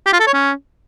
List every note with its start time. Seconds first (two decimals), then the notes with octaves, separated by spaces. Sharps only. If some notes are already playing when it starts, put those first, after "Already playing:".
0.06 G4
0.13 F4
0.20 A4
0.27 C#5
0.34 C#4